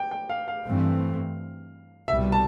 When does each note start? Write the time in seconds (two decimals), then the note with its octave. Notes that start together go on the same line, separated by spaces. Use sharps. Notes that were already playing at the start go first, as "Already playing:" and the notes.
Already playing: G5
0.11 G5
0.29 F5
0.48 F5
0.66 G2 E3 A3 C4
2.08 C2 B2 G3 E5
2.32 A5